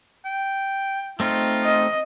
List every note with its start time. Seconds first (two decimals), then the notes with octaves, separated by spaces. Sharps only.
0.25 G5
1.20 A3 C4 D#4 F4
1.64 D#5